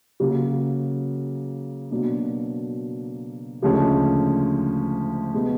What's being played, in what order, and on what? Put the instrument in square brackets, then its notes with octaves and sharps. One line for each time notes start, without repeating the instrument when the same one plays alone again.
[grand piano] C#3 F#3 A#3
B2 F#3 A#3 D4
D2 C#3 F3 G#3 C#4
B2 G#3 B3